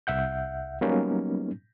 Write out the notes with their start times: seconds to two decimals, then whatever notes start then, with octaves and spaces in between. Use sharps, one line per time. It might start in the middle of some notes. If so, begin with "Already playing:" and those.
0.07 C2 E5 F#5 G6
0.81 F#3 G3 A#3 B3 C#4 D#4